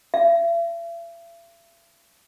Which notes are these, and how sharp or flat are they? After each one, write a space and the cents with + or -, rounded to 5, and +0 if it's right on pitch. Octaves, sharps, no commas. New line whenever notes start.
E5 +45